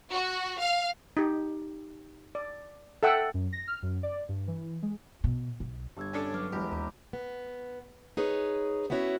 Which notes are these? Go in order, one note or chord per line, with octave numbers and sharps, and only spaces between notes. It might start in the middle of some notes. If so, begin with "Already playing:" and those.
F#4
F5
D#4 G4
D5
A4 E5 F#5 G5 E6
F#2
A#6
F6
F#2
D5
G2
E3
G#3
B2
B1
G1 G4 E6 G#6
C#4 D4 A4
F#3 B4 D6 F6
E1 E4 G4
D#2 A#5 D6
B3
D#4 G#4 B4 C#5
B3 C#4 E4 F#4 C#5